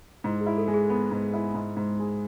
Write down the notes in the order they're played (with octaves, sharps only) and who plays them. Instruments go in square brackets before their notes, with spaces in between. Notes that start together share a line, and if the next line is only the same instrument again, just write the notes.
[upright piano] G#2 [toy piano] E4
[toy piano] G#4
[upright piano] E4
[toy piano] A4
[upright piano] G#3
[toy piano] G#4
[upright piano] B3
G#2
E4
G#2
G#2
G#3